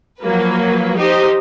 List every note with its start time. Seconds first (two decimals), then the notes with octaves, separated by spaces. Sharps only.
0.21 F3 F#3 A#3 B4
0.97 D#4 G4 C5